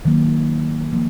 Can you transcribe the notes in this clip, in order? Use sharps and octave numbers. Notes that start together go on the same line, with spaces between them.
D#3 F#3 A#3
F3 A#3